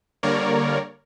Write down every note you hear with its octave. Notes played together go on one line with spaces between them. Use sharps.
D3 G3 A#3 A#4 C#5 D5